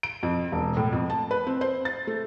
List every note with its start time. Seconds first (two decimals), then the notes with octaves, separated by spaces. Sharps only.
0.03 D7
0.23 F2
0.52 E1
0.77 A2
0.93 F2
1.10 A5
1.31 B4
1.47 C4
1.61 C5
1.85 A6
2.07 A3